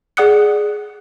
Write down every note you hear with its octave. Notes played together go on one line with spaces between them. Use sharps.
G#4 D5 F#5 D#6 F#6 C#7